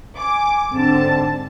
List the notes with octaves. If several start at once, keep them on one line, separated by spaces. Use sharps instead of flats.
G#5 D6
G#2 D3 C4 A5